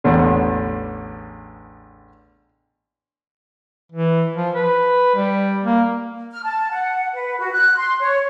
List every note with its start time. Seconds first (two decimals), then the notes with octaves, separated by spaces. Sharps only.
0.04 A1 E2 D3
3.92 E3
4.36 F3
4.55 B4
5.15 G3
5.63 A#3
6.32 F6
6.44 A5
6.71 F#5
7.14 B4
7.39 F#4
7.52 F#6
7.77 C6
8.00 C#5